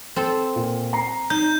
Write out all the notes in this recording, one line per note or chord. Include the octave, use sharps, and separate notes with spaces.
C4 A4
A#2
A#5 C7
D#4 G6